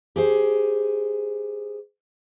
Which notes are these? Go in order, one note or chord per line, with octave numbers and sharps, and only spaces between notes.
G4 G#4 C5